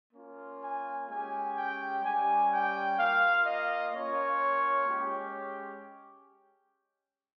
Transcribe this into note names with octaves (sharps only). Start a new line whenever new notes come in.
A#3 C#4 F4
G#5
G#3 C#4 G4 G#5
G5
G3 C#4 G4 G#5
G5
A#3 F4 F5
D#5
A#3 C#4 F4 C#5
G#3 C#4 G4